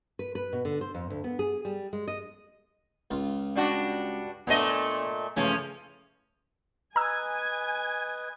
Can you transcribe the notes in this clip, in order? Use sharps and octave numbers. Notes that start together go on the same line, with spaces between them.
B4
B4
B2
D3
C5
F2
D2
B3
G#4
G3
G#3
D#5
C#2 F4 C6
G3 D4 F#4
A#2 A3 B3 D4 D#5
C#3 E3 F3 A3 C#4
B4 D#5 G#5 A#5 E6